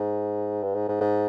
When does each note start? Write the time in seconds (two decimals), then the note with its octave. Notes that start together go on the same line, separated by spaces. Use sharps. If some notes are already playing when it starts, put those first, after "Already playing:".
Already playing: G#2
0.63 G2
0.75 G#2
0.89 G#2
1.01 G#2